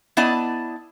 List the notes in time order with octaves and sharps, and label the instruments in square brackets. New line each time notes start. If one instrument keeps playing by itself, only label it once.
[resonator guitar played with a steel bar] B3 E4 D5 D#5 A5